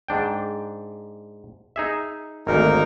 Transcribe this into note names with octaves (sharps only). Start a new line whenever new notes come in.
G#2 D4 G5
D#4 G#4 E5
G#1 D2 A#3 D#4 A#4